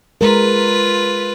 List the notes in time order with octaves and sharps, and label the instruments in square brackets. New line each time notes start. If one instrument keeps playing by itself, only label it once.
[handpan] G#3 A#4 [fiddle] F4 B4